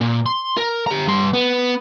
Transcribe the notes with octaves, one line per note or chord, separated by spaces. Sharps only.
A#2
C6
A#4
G4 A#5
G2 C6
B3